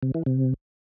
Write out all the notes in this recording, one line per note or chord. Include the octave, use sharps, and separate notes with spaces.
C3
E3
C3